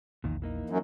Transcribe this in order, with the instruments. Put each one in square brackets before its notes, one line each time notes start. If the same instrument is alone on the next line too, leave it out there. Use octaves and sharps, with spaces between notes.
[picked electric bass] A#1 E2 [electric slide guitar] A#2 D#3
[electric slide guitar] E3 A#3 D#4
[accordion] F#2